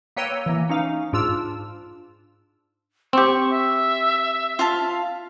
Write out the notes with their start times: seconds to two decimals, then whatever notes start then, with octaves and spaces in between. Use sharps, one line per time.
0.17 A#3 B4 C#5 G5 E6 D#7
0.46 E3 A#3
0.69 C#4 D#4 F5
1.13 G#2 D4 F4 E6 E7
3.13 C4 G4 C#6
3.50 E5
4.59 F4 F5 A5